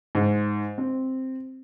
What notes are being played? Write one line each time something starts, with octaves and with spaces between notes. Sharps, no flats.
G#2
C4